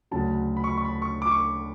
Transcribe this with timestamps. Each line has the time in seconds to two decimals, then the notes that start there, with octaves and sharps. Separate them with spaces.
0.11 D2 C#3 F#3 A5
0.57 B5
0.64 C#6
0.71 B5
0.77 C#6
0.85 B5
1.02 C#6
1.22 D6
1.31 C#6